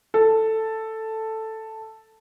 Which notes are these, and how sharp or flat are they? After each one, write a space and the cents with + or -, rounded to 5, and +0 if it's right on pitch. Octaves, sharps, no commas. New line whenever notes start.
A4 +5